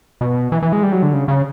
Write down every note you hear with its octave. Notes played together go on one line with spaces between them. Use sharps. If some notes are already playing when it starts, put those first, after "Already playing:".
B2
E3
E3
G#3
G3
F#3
D3
C#3
C#3